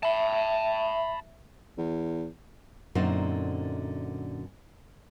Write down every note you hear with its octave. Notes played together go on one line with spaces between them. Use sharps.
E5 A5 B5
E2
F#2 A#2 D3 C4 D#4 C5